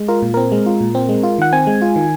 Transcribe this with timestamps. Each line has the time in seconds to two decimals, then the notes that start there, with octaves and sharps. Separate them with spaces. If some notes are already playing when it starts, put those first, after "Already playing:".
Already playing: G#3
0.08 F4 A#4
0.22 A#2
0.34 C4 A#4
0.52 G#3
0.66 F4
0.81 A#2
0.95 C4
1.09 G#3
1.23 F4
1.38 D#3 F#5
1.53 C4 G#5
1.67 G#3
1.82 F4
1.96 D#3